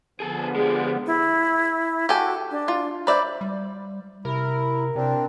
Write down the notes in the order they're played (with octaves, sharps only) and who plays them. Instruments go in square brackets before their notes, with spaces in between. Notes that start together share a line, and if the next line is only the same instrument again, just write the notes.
[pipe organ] D3 F3 B3 [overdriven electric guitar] G#4 A4
[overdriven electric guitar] G#3 G4 [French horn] G#4
[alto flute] E4
[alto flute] F#4 [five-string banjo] G4 A4 G#5
[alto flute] D4
[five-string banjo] F4
[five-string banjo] B4 D5 E5 [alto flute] C5
[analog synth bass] G3
[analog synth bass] C3 [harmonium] E4 [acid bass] A#4
[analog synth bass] C3 [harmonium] C4 D4